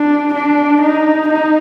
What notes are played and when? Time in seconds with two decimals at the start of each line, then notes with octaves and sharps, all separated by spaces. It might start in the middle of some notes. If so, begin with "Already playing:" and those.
Already playing: D4
0.34 D4
0.82 D#4
1.29 D#4